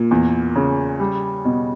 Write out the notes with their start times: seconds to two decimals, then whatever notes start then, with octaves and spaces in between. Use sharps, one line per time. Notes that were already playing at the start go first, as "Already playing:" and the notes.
Already playing: A#2
0.11 E2
0.56 C#3
1.00 G3
1.45 B2